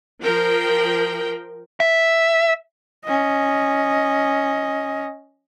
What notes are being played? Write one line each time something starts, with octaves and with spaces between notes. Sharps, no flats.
F3 A#4 G5
E5
C#4 D#5